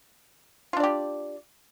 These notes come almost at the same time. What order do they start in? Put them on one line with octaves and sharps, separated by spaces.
F4 D4 D5 G4